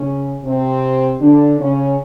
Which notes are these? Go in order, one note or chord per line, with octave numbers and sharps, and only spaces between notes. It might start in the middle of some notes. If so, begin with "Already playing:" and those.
Already playing: C#3 C#4
C3 C4
D3 D4
C#3 C#4